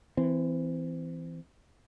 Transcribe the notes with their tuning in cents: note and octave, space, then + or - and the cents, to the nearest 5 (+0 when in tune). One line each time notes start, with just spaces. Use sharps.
E3 +0 C4 -25